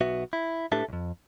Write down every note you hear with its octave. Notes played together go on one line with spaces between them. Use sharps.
B1 B3 F#4 E5
E4
A2 D4 G4 A4 B4 E5
B1 F2